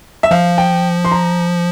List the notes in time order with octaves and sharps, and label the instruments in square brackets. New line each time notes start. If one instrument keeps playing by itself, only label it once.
[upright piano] E5
[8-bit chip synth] F3 [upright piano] F5
[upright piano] G5
C6
A#5